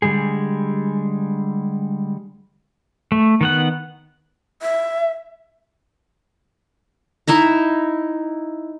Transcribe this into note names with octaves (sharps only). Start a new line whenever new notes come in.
D3 G3 G#3 G#4
A3
D#3 B3 F#5
E5
D#4 E4 E5 A#5